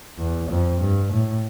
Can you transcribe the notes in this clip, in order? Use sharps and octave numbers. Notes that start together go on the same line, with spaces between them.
E2
F2
G2
A2